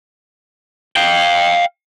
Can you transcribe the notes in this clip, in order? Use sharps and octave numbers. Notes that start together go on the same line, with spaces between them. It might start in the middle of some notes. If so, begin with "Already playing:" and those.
F5 G5